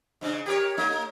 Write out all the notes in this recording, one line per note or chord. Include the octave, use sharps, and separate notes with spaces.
G#2 C#3 D4
G4 A#4 C#5
A3 D#4